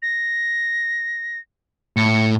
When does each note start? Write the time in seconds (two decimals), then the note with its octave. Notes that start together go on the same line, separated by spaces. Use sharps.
0.02 A#6
1.97 A2 C#7